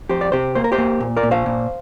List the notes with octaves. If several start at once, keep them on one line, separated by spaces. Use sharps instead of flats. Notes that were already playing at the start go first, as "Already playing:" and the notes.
F2 G4 C5
D5
C3 G4 C5
A#3 C5
A#4
G4 C5
A#3
A#2
A#4 D5
A#2
C5 F5
A#2